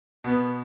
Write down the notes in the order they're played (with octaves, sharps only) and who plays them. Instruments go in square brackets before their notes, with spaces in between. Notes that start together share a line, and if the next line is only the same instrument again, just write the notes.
[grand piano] B2 [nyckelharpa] B3